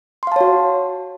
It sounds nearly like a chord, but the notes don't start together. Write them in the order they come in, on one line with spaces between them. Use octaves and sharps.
C6 F5 A5 C#5 F#4